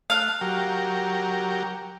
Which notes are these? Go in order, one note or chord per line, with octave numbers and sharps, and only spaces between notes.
A3 F5 F#6
F#3 G4 A#4